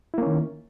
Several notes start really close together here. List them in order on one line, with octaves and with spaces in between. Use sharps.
E4 A#3 C#4 D#3